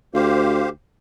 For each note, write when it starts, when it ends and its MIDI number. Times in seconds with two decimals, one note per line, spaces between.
0.14 0.68 38
0.14 0.69 67
0.14 0.69 72
0.14 0.69 77